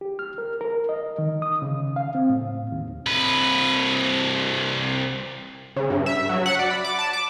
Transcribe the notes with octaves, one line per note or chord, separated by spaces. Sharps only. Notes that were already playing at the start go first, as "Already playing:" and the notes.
G4
F6
A#4
A#4
D#5
D#3
D#6
C#3
F5
C4
A2
D#2
C2 B4
C#3
G2
E5
F#3
F#5
D5
B5
D6
A5
D6